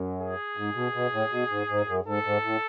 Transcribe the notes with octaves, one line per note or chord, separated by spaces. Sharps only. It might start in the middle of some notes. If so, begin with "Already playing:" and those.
Already playing: F#2
G#4
G#2
B2
B2
A2
B2
G#2
G#2
F#2
G#2 A4
G#2
A2